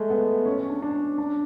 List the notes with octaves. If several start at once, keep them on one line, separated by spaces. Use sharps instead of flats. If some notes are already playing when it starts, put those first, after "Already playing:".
Already playing: G#3 A3
B3
C#4
C#4
D4
D4
D4